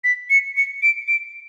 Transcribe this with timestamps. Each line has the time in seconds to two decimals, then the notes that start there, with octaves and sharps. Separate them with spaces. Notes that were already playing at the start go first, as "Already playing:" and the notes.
0.04 B6
0.30 C#7
0.56 C#7
0.82 D7
1.08 D7